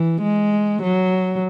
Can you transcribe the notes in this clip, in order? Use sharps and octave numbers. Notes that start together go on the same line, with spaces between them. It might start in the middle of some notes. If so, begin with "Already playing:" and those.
Already playing: E3
G#3
F#3